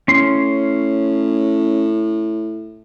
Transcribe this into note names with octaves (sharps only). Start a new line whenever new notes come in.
A2 C#4 C6